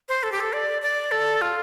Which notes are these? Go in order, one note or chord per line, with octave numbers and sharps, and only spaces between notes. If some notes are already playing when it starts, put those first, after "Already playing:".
C5
A4
G4
A4
D5
D5
A4
F4